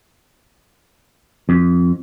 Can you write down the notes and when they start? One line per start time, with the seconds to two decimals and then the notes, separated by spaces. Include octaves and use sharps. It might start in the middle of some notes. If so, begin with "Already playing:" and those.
1.49 F2